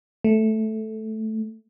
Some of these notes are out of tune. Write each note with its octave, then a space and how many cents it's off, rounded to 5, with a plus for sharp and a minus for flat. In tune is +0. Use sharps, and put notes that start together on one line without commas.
A3 -5